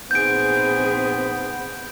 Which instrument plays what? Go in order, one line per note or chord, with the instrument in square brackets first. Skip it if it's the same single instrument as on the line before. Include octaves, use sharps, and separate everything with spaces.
[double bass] A#1 C4 [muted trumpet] B3 [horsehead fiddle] D#4 G#4 [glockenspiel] G6 D7